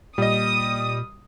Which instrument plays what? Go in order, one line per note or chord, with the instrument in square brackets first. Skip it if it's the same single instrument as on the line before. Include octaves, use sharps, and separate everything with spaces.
[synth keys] A#2 [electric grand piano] G3 D#5 [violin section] D#6